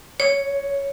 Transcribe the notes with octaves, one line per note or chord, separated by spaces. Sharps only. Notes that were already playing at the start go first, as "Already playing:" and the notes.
C#5